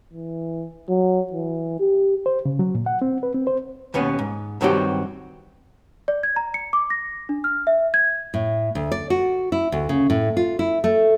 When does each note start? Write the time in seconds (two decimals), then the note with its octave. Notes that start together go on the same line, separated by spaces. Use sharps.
0.13 E3
0.89 F#3
1.33 E3
1.80 G4
2.26 C5
2.46 C#3
2.59 F#3
2.75 A#2
2.86 F#5
3.02 C4
3.23 B4
3.35 C4
3.47 C5
3.94 D#2 B2 B3 C#4
4.19 G#2
4.61 G2 D#3 F#3 C4 F#4 G4
6.08 D5
6.23 G#6
6.36 A#5
6.54 C#7
6.73 D6
6.90 A#6
7.29 D4
7.44 F6
7.67 E5
7.94 G#6
8.34 A2
8.75 D2
8.92 D5
9.10 F#4
9.52 E4
9.72 D2
9.89 C#3
10.10 A2
10.37 F4
10.59 E4
10.84 A3